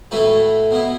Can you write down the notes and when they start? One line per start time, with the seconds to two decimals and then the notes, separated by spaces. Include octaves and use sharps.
0.11 A2 A3 E4 F#4 B4
0.71 B2 B3 E4